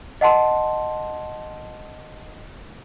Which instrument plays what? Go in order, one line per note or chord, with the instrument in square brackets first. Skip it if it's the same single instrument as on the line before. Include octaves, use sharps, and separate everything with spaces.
[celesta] D#5 F#5 A5 C6